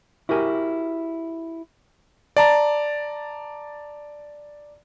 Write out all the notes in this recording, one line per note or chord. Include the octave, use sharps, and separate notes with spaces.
E4 F#4 G4 A#4 G#5
D5 A5 A#5